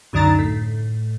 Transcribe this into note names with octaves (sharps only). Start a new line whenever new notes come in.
C#2 F#2 D3 D#4 A#5 A6
A2